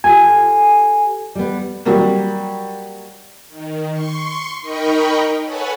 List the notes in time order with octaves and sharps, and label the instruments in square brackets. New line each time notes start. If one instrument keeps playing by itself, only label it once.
[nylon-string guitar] F4 G4 A4 [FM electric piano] G#5
[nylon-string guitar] G3 B3
[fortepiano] F#3 G3 A#3
[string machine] D#3
C6 C#6
D#4 A#4 D#5 G5 B5 C#6
A4 B4 C#5 F#5 G#5